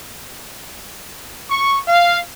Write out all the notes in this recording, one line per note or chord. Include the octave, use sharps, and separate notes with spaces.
C#6
F5